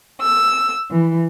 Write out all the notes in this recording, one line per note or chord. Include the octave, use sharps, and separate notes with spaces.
E6
E3